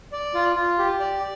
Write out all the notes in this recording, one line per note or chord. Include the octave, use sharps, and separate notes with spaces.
D5
F4
F4
G4
D5